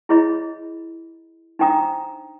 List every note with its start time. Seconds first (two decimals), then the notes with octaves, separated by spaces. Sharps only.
0.09 E4 G#4 C#5 D#5 B5
1.59 D4 D#4 C5 G5 A#5 D#6